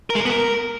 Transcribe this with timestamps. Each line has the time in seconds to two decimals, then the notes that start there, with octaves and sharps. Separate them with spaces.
0.10 A#4
0.15 G#3
0.20 A#4
0.25 B3
0.30 A#4